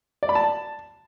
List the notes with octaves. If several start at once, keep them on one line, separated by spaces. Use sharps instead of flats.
D5
B5
A5